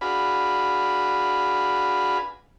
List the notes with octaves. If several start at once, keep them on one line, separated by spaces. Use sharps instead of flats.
D4 F#4 G#4 B4 F5 B5